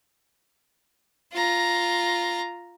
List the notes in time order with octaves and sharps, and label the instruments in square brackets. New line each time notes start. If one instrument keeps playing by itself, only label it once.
[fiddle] F4 A#5